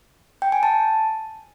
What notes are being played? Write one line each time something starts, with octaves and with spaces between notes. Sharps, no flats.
G5
G#5
A5